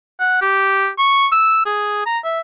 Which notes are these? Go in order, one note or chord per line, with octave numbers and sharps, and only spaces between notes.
F#5
G4
C#6
E6
G#4
A#5
E5